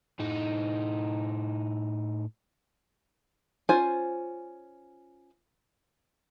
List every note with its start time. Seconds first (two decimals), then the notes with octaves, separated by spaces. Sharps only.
0.19 A2 D#4
3.69 C#4 F4 C5 G#5